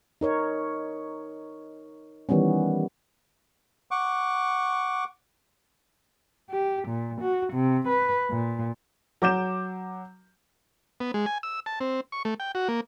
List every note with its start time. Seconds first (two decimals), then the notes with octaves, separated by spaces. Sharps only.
0.21 D#4 A#4 C#5
2.29 D#3 E3 G3 B3 C#4
3.91 F#5 C#6 D6
6.50 G4
6.89 A#2
7.22 F#4
7.53 C3
7.88 B4
8.30 A#2
9.22 F#3 D6 G6 E7
11.00 B3
11.14 G#3
11.26 G#5
11.43 E6
11.66 A5
11.81 C4
12.12 C#6
12.25 A3
12.40 G5
12.55 F#4
12.69 A#3